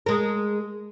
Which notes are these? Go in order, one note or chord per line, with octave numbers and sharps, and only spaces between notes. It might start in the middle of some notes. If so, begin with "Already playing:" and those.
G#3 A#4